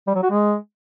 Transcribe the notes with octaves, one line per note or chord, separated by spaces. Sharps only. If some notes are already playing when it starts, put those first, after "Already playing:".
G3
F#3
F#4
G#3